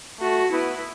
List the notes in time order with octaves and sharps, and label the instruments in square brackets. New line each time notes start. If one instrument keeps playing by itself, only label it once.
[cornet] A3 [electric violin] F#4
[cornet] B3 [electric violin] E4